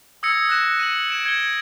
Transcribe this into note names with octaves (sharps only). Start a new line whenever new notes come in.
D#6 E6 G#6 A#6 C#7
F#6 A#6 E7
D#7 E7 F#7
G#6 D7 E7
G#6 C#7 G7